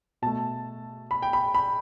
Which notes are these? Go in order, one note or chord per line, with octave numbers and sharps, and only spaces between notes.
B2 A3 A5
B5
G5
B5
B5